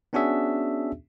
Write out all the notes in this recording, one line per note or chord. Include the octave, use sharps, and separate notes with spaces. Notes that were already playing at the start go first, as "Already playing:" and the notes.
B3 C#4 D4 F#4 G#4 E5